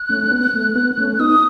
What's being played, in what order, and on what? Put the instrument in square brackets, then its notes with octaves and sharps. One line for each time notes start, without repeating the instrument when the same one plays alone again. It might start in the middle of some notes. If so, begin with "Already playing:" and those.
Already playing: [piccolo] F#6
[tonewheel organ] A3 C#4
C#4
B3
A3
B3
A3 C#4
[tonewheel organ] B3 D#4 [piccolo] D#6